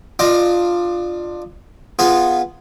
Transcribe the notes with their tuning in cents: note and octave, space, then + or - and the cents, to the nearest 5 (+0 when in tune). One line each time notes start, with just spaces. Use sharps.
D4 +25 F4 +0 D#5 +0
B3 +0 F4 -10 G#4 +0